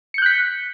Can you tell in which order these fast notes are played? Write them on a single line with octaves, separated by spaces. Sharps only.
C#7 G6 F#6 B6